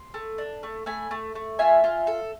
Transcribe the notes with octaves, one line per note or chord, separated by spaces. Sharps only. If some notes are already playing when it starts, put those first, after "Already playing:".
Already playing: C6
A3
D4
A3
A3 G#5 B5
A3
A3
F4 E5 G#5
F4
A4